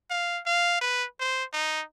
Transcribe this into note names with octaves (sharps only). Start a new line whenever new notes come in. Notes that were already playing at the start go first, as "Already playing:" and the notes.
F5
F5
B4
C5
D#4